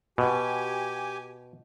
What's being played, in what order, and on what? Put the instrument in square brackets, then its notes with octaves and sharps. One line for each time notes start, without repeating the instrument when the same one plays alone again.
[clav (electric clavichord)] B2 [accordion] G4 G#5